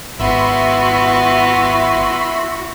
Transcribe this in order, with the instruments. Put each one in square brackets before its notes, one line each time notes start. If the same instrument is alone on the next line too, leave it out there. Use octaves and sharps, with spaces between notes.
[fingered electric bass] G#1 [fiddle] B3 [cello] E4 F#4 [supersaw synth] E5 B5 C6